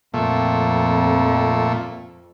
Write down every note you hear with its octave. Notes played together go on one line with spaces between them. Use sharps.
F2 A#2 A3